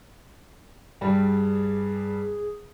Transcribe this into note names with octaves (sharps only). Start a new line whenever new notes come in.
G2 G3 G#4